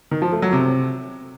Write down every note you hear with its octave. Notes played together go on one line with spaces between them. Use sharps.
D#3
F3
A3
F#3
C3